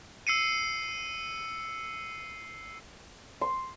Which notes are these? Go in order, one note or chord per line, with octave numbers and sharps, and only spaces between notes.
E6 C7 C#7 D#7
C6